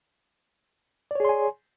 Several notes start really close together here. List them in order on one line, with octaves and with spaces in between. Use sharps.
D5 C#5 G#4 C6 G#5